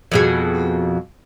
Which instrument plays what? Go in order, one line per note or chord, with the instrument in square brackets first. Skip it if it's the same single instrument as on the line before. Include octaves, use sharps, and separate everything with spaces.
[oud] F2 B2 G#4